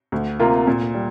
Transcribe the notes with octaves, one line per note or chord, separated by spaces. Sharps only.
D2
C3 A#3 F4
A#2
G3